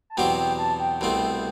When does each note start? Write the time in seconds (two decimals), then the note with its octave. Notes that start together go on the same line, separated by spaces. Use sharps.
0.10 A5
0.17 E2 B2 F#3 C4 G4 G5
0.38 G5
0.59 A5
0.79 G5
1.01 C2 B2 A3 C4